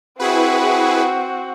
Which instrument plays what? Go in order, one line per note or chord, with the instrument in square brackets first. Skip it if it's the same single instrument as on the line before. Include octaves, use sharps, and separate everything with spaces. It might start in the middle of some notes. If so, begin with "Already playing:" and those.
[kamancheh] C4 F#4 [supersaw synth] E4 G#4 B4